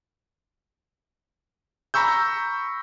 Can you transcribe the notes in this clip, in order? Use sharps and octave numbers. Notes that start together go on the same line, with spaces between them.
A#5 B5 C#6 E6 G6